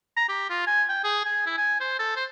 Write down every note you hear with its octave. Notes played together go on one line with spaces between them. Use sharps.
A#5
G4
F4
G#5
G5
G#4
G#5
E4
G#5
C5
A4
C5